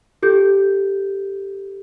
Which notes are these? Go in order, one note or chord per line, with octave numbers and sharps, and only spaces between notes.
G4 A4 G6